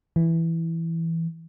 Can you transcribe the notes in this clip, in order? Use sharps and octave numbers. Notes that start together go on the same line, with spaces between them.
E3